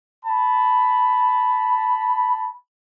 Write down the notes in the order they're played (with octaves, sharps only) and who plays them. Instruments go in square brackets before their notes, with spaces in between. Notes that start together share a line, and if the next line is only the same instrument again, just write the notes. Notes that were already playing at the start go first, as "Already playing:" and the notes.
[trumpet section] A5 B5